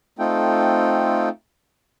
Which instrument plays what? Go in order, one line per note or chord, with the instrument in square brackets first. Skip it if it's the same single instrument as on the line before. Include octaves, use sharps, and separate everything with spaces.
[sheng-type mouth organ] A3 C4 D#4 F4 A4 G5